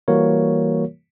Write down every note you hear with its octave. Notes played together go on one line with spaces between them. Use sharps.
E3 G3 A#3 F#4 A#4 C#5